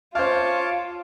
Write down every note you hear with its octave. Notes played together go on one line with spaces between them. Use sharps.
F4 C5 C#5 F5 A5 D6